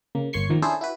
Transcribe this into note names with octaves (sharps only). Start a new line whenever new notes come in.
C#3 A#3
G1 A#3 C#5 C6 C#6 C7
A#2 D#3 F3 A#3
C#4 D4 E4 G#4 A4 C5
E4 F#4 B4